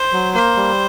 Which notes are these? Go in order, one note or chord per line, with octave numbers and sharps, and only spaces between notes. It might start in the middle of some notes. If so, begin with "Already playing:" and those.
Already playing: C5
F#3
A#3 C5
G3